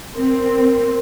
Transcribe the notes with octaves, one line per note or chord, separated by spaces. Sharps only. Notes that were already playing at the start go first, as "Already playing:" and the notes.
C4 A#4